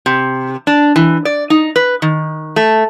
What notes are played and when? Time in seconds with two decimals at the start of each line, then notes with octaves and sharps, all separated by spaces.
0.06 C3
0.67 D4
0.96 E3
1.25 D5
1.50 D#4
1.76 B4
2.02 D#3
2.56 A3